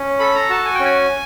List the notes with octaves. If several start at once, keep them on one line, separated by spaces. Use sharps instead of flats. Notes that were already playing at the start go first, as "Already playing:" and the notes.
Already playing: C#4
A4 B5
A#5
F#4 A5
G#5
G5
C#4
G#5